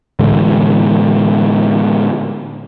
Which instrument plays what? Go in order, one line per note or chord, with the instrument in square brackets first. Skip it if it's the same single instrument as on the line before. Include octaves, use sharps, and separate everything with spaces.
[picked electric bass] A2 D3 E3 G#3